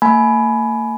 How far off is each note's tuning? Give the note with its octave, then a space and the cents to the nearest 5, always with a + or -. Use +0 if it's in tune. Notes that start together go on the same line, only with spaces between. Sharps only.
A#3 -40 G#5 +25 B5 +0